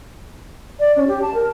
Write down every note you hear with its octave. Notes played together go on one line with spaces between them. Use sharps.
D5
C#4
G4
A5
A#4